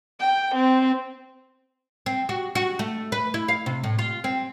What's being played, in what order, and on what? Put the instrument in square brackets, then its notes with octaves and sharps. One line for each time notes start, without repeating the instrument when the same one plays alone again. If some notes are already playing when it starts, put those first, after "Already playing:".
[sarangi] G5
C4
[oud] C4
F#4
F#4
A3
B4
E4
F5
C3
A2
F4
C4